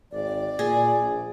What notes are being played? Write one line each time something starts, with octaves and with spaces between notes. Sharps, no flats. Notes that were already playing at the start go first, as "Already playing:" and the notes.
G#1 D5
A#2 G#4
A#1